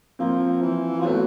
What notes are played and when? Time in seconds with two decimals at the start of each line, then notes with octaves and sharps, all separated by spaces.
0.19 F3 A#3 C4
0.62 E3
1.00 F3
1.05 F#3 A3 B3